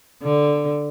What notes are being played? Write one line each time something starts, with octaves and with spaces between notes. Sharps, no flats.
D3